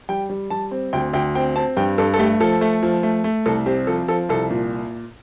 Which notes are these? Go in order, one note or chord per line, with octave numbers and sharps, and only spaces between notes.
G3 G5
G3
G3 A5
C4
D2 G5
D2 G5
C4 G5
C4 A5
G2 G5
G2 A4
A4
A3 G4
F3 A4
A3
F3
A3
A3
C2 A4
C4 G4
F3 A4
F3 A4
C2 A4
A#2